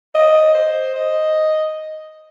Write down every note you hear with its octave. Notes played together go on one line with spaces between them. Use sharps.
D#5
C5
D#5